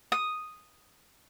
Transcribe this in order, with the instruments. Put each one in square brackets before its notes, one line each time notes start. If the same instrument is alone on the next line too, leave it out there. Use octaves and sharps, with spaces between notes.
[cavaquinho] D#6